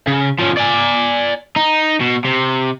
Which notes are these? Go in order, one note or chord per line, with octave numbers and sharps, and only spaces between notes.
C#3
F3 C#4
D5 G#5
D#4
B2
C3